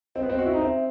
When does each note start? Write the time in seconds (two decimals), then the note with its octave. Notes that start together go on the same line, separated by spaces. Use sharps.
0.16 C4 D#5
0.23 B3
0.30 C4
0.38 F#4 D#5
0.46 E4
0.54 D#4
0.61 C4 E5